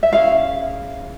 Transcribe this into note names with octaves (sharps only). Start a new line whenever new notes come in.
E5
C#4 E4 G#4 F5